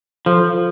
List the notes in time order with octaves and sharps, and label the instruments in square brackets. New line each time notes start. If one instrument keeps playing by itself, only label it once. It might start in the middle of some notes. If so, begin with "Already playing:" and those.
[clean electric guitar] F3 [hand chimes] F4 A4